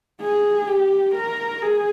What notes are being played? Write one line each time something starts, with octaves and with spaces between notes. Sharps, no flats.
G#4
G4
A#4
G#4